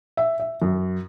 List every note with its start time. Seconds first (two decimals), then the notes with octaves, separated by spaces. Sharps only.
0.17 E5
0.40 E5
0.62 F#2